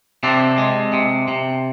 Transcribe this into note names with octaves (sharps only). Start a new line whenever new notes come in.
C3 C4 D4
G#3
C3
C3